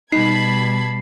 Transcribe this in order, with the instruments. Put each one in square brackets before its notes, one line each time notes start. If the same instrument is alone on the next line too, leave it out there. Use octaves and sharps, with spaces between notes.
[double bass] B2 G3 [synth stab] D#4 [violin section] A5 B5 G#6 [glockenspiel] C7